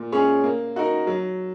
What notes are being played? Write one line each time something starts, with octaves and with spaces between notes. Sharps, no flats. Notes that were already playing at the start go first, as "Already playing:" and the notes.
Already playing: A#2
G#3 C#4 G#4 C#5
A#3
D#4 F#4 A#4
F#3